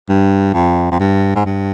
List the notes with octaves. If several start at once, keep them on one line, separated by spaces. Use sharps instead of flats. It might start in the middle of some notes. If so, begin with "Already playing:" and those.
G2
F2
F2
G2
G#2
G2